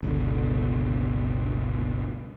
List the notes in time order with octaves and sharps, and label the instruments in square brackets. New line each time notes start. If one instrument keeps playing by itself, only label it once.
[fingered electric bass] G1 C#2 B2 D3